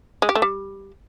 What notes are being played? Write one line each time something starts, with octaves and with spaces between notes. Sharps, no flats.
G#3
G4
A3
G3